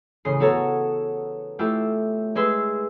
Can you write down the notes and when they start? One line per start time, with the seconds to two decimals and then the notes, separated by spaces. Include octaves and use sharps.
0.25 A1 C#3 C6 D#6 C7
0.40 B3 F#4 A4 C#5 A5 A#5
1.59 A3 E4 F4 G4
2.35 G#3 G#4 B4 C6 E6